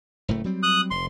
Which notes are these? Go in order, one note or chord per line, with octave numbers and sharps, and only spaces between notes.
F#1 A2 A3
F#3 G3 C4
D#6 F#6
F1 C6